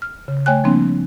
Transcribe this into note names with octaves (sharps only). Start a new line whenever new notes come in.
F6
C#3
A3 C#5 G5 G#5 F#6
F3 G3 A#3 C4 D4